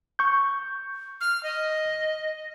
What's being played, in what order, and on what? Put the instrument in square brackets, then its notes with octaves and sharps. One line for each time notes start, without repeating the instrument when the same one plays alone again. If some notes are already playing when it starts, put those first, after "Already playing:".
[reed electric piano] C#6 G6
[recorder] F6
D#5